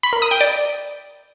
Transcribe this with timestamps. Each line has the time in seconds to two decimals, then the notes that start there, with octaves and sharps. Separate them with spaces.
0.03 B5
0.13 A#4
0.22 D#6
0.31 G5
0.41 D5